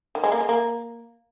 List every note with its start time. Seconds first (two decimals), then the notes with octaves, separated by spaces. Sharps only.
0.15 D#3
0.24 G#3
0.32 A#3
0.40 G#3
0.49 A#3